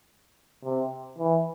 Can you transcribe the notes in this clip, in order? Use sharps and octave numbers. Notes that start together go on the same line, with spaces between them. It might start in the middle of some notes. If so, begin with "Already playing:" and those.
C3
E3